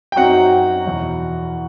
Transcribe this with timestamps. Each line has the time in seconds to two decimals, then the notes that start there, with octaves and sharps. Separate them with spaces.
0.12 G5
0.16 F#2 F#3 C4 D#4 F#4 F#5
0.85 E2 B2 F#3